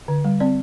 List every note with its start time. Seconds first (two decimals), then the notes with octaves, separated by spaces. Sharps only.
0.08 D3
0.24 G3
0.40 C4 D5